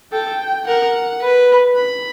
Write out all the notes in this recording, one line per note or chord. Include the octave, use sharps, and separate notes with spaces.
A4 G5
A#4 F#5
B4
B5